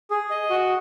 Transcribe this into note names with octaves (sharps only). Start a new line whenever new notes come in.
G#4
D#5
F#4